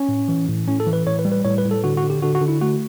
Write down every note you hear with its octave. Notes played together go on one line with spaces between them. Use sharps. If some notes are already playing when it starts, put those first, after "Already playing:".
Already playing: C#4
A2
E3
A2
A2 C#4
A4
E3
B4
A2 C#5
B4
G3
B4
A2 C#5
B4
A2
A4
D3 F#4
F#4
D3
G4
D3 F#4
F#4
D3
E4
A3 F#4